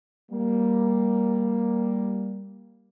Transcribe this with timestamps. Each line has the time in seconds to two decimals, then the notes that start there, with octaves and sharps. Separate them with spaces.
0.32 G3 A#3